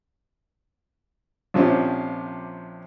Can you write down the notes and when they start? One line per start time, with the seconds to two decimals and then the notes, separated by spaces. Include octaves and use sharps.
1.54 A#1 C3 F3 C#4 D4 G4